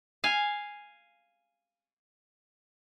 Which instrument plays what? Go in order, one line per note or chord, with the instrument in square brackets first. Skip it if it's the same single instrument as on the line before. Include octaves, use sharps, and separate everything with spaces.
[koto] F5 G#5